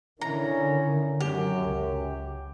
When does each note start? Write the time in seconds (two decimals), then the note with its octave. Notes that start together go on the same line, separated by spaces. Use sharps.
0.21 D3 D#3 C#4 D#4 E4 A#5
1.20 F#2 F#3 G4
1.65 C#2